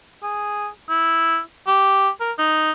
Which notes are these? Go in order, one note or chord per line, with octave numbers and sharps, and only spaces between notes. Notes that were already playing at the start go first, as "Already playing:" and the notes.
G#4
E4
G4
A#4
D#4